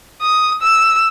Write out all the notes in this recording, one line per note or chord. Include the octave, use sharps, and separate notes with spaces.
D#6
E6